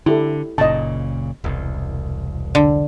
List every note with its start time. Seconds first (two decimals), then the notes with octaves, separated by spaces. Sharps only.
0.06 D3 E4 G4 A4
0.58 F#1 A#2 C#3 D#5 A5
1.44 E1 C2
2.55 D3